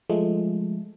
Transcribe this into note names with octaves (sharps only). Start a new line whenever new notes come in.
F3 G#3 A3